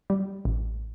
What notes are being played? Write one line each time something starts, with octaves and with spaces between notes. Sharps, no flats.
G3
A1